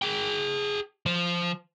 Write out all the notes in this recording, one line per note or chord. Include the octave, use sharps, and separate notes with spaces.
G#4 G5
F3 C5